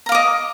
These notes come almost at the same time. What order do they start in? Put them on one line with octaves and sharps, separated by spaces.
A#5 F5 D6 D#5